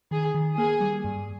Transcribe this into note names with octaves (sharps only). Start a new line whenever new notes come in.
D#3 G#4
D#3
A#3 G#4
G3
G2